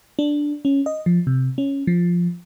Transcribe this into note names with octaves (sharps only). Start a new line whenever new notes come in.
D4
C#4
D#5
F3
C3
C#4
F3